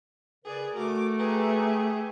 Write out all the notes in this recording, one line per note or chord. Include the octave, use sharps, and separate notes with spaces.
C#3 G#4 A#4 B4 D5
A3 F#4 A#4 D6
G4 G#4 B4 A#5